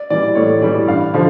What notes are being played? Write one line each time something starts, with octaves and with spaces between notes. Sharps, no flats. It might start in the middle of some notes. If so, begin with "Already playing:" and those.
Already playing: D5
E3 G3 D5
A2 C#5
E3 G3 D5
G2 F5
D3 F3